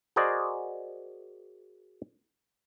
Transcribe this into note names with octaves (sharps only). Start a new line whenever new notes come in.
F#4 G#4 A#4 C5 D5 D#5